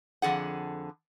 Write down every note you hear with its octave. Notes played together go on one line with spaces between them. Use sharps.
F2 D3 G#4 F#5